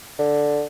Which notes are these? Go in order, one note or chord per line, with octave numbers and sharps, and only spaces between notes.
D3